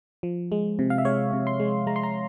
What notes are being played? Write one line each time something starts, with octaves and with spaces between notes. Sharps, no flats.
F3
G#3
C3
F5
E5
G#3 C#5
C3
C6
G#3
G#3 A#5
C6
A#5